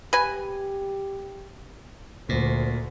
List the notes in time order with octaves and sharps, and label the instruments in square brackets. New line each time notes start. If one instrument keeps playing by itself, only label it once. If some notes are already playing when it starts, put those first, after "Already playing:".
[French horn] G4 [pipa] B4 G#5
[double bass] D2 [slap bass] A#2 [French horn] C5